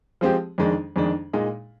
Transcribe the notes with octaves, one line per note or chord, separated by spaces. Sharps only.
F3 G#3 C4 G4
F2 D#3 G#3 D4
F2 D#3 G#3 D4
A#2 G#3 D#4